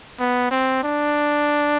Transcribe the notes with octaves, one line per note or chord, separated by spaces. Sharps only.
B3
C4
D4